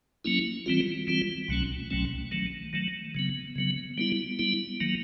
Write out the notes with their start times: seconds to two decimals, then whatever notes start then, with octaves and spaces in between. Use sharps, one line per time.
0.25 F#3 A#3 C#4 E4
0.66 E3 G3 C4 F4
1.07 E3 G3 C4 F4
1.48 C2 B2 F#3 A3 C#4
1.90 C2 B2 F#3 A3 C#4
2.32 D#3 F#3 A3
2.73 D#3 F#3 A3
3.15 C#3 F#3 B3
3.55 C#3 F#3 B3
3.98 G3 B3 E4
4.39 G3 B3 E4
4.80 D#3 F#3 A#3